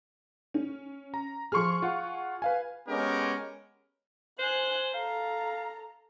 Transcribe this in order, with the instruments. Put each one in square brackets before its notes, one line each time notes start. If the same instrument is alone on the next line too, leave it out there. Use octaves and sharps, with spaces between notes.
[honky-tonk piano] C#4
[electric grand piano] A#5
[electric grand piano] F3 C6 F6 [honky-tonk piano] G#4 C#6
[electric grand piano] F4 F#5
B4 F5 G#5
[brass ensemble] G#3 B3 C#4 G4 A#4
[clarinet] C5 [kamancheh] G#5 F#6
[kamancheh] A4 A#5 [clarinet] F5